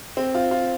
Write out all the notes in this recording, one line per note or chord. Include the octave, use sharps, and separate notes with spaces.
C4
F4
F4